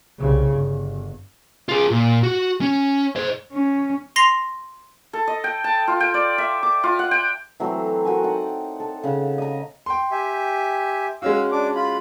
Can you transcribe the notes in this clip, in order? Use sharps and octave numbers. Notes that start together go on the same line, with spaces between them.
C2 C#3
G1
F4 G#4
A#2
F#4
C#4
C5 D#5
C#4
C6 A#6 C7 F7
A4
D#5
G5
A5
F4
G5
D5
E5
D6
F4
F#5
G5
E3 F#3 A3 C4
F#4 A#4 G#5
D#4 F#5 G5 A5
A4
C#3 F5 F#5
D#5 E5 A#5
G5 C6
G4 E5 G#5
G#3 C#4 F#4 F5 E6
D4 D6
F4 B5